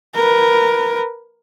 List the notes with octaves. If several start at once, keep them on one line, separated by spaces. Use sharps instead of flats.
A#4 B4